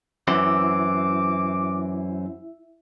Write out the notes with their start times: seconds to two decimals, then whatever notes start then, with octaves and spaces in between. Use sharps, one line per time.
0.28 F#2 E3 C4 E4 E5 D6